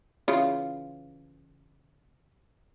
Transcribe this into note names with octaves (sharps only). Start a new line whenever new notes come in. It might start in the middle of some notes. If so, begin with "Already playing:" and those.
C#3 E3 F4